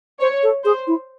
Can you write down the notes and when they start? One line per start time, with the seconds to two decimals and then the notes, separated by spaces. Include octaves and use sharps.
0.21 C5 C#5
0.43 A4
0.64 G#4 C5
0.87 E4